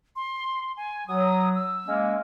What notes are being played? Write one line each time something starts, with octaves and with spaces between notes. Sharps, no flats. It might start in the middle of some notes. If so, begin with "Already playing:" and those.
C6
G#5
F#3 D#6
E6
G#3 A#3 C#4